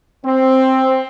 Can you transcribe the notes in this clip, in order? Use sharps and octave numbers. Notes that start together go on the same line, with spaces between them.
C4